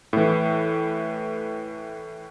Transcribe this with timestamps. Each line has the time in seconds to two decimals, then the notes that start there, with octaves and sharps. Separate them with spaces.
0.13 A2 E3